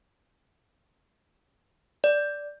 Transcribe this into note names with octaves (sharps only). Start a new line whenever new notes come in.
D5